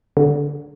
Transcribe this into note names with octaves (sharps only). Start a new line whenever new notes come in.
D3